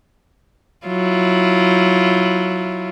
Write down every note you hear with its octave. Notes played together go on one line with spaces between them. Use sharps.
F#3 E4 F4